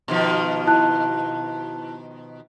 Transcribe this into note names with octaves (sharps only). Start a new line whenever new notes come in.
B2 D#3 F3
E4 A5 F#6